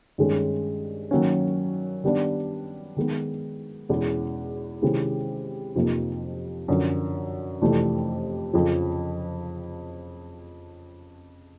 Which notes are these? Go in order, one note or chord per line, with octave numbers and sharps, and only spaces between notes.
G2 D#3 G#3 C#4
D#3 F#3 A#3 C#4
D#3 G3 B3 D4
D#3 G#3 B3
E2 B2 G#3 C#4 E4
C3 D#3 G#3 C#4 E4
F2 C3 F3 A#3 D#4
F#2 D3 F3
F2 C3 E3 A3 D4
F2 C#3 F3